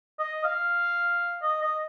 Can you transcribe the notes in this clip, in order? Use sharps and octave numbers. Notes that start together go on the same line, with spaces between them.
D#5
F5
D#5
D#5